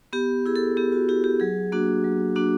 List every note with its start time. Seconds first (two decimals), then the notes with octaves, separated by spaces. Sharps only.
0.13 B3 G4
0.46 E4 G#4
0.56 A4
0.77 B3 G4
0.92 F#4
1.09 E4 G4
1.24 G4
1.40 F#3 G#4
1.72 A#3 D4 F#4
2.04 F#3
2.36 A#3 D4 F#4